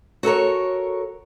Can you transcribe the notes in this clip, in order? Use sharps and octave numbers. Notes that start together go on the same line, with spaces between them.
F#4 A4 A#4 C#5